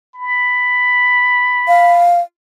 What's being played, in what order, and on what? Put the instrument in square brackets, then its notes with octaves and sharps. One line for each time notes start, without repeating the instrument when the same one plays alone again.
[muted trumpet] B5
[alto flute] F5